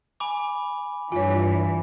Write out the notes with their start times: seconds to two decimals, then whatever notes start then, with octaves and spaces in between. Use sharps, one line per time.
0.20 G#5 B5 D6
1.12 G2 E3 F4 C#5 G#5